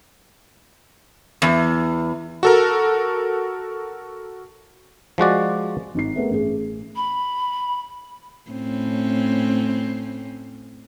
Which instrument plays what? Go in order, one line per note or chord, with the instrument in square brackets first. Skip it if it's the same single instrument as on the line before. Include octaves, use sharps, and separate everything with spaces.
[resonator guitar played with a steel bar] E2
[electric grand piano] F#4 A4 A#4
[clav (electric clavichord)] F3 G#3 F#4 D5
[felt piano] G#1 D#4 C7
A3 B3 G#4 A#4
A1 G#4
[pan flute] B5
[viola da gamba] A2 C4 C#4